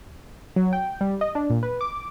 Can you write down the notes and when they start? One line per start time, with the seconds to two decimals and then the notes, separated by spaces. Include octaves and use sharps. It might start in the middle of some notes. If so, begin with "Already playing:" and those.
0.56 F#3
0.73 G5
1.01 G3
1.21 D#5
1.35 D4
1.50 A#2
1.63 B4
1.81 D6